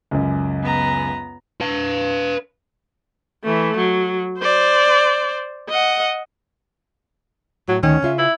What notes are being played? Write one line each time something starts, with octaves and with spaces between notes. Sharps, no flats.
C#2 F#2
B3 A#5
B4 F5
E3 A3
F#3
C5 D5
D#5 F#5
A2 F#3
D2 D#3 C#4
C#3 F4 E5
E4